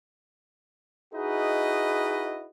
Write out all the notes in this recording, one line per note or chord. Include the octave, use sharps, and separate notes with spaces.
D#4 E4 F#4 G#4 B4 D#5